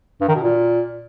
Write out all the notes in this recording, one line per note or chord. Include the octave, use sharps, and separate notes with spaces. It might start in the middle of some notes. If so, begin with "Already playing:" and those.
G2
D#3
B2
A#2